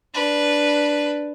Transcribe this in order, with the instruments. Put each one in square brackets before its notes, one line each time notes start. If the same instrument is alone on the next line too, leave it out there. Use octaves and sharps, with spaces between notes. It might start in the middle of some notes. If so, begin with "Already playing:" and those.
[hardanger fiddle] D4 B4